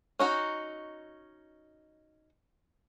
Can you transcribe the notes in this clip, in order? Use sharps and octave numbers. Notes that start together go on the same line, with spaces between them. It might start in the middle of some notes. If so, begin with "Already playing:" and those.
C#4 D#4 F#4